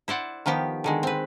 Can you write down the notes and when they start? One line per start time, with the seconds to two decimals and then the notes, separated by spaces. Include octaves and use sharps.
0.08 E4 C5 D5 F#5
0.46 D#3 F3 B3 G4
0.84 D3 D#3 G#3
1.03 C4 B4